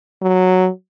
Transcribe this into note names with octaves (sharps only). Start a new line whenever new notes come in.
F#3